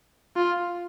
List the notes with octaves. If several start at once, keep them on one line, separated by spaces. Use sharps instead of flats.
F4